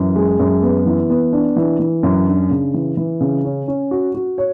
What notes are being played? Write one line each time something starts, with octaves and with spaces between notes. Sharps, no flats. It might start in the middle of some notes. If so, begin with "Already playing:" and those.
Already playing: F#2 E3
G#3
F#2
B3
E3
B3
D4
E3
E3
F#2
D4
C#3
E3
E3
C#3
C#4
C#4
F#4
F#4
C#5